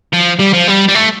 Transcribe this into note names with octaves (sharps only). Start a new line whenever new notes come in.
F3
G3
F3
G3
G3
A3